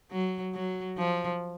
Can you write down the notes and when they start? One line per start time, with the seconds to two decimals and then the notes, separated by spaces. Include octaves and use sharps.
0.11 F#3
0.54 F#3
0.98 F3